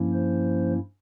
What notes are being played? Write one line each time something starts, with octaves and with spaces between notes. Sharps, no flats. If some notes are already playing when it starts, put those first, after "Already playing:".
Already playing: G2 F3 A#3 C#4 E4
C5